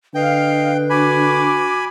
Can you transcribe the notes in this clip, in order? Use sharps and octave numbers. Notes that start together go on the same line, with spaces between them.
D3 B4 D#5 F5 G5
F#4 G#5 B5 D6